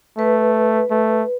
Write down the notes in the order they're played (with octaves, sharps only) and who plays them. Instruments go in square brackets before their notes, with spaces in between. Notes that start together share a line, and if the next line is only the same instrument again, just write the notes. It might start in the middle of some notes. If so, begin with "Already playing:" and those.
[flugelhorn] A3 [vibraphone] B4
[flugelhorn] A3